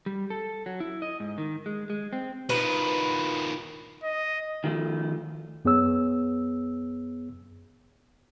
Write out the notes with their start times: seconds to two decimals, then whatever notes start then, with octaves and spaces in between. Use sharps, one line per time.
0.06 G3
0.30 A4
0.66 F#3
0.80 E4
1.02 D#5
1.20 G#2
1.38 D#3
1.66 G#3
1.90 G#3
2.13 C4
2.49 D#3 F3 B4
4.03 D#5
4.64 D#3 F3 A3
5.65 F#2 B3 G#4 C#5 E6